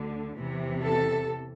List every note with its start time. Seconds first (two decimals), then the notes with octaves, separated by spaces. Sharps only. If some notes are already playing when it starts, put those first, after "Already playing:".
Already playing: D2 D3
0.38 E2 C3 E3
0.85 A4